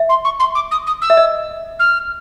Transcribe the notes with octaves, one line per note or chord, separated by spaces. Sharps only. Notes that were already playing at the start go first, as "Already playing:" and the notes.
Already playing: E5
C6
C#6
C6
D6
D#6
D#6
E6
E5
D#5
F6